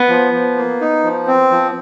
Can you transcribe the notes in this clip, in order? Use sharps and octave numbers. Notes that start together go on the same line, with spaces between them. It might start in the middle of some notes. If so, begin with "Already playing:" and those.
Already playing: B3
F3
F3
A#3
D#4
F3
C4
F3